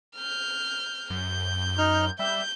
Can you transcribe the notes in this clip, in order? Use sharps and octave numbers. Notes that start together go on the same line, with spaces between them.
F6 G6
F#2 G6
D#4 F6
G3 E5 G6